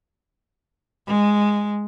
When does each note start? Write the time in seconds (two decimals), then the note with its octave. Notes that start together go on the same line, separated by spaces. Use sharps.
1.07 G#3